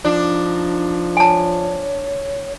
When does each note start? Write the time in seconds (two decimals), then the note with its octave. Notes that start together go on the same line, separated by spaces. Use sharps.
0.05 F3 D4 D#4
1.17 C#5 G#5 A5